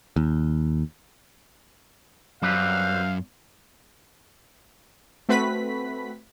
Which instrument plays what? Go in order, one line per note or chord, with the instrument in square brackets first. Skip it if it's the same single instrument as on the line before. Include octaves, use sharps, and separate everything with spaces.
[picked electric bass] D#2
[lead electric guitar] F#2 [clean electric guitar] G3 C4 B4 [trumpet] F5
[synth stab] A3 C4 F#4 B4 B5 B6